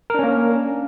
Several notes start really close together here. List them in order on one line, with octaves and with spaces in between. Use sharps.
A#4 D4 C#4 A#3